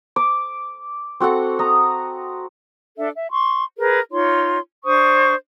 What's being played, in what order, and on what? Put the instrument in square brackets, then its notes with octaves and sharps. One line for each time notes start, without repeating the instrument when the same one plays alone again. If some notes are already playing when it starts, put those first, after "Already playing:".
[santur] D6
C4 F#4 A4 F#5
D#5 A#5
[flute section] D4 A4 E5
E5
C6 C#6
G#4 A#4 B4
D#4 F4 C#5 C6
D4 C5 C#6 D#6